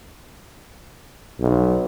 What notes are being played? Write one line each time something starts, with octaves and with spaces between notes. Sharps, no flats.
B1